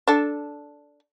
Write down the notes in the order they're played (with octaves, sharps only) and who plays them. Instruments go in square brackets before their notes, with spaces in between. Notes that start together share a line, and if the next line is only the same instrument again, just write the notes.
[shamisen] D4 A4